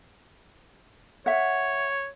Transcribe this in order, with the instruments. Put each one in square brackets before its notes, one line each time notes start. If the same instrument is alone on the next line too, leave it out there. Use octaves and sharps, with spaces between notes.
[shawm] C#5 [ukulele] E5 F#5